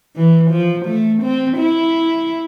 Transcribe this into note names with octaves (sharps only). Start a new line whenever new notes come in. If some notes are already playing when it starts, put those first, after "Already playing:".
E3
F3
A3
C4
E4